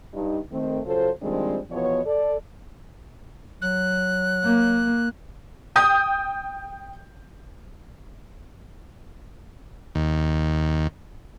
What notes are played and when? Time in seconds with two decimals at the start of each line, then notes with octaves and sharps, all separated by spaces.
0.14 G2 D#4
0.52 D#3 A3 C4
0.86 C#3 F#3 F4 A4 C5
1.22 D#3 F3 G3 G#3 C4 D4
1.70 E2 B2 F3 B3 C#5
2.05 A4 D5
3.62 F#3 F#6
4.44 A#3
5.76 G5 D#6 G6
9.95 D#2